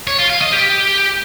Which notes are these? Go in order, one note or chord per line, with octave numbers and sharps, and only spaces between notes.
C#5
F4
F5
D#5
G4